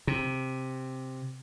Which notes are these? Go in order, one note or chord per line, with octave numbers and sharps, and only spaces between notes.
C3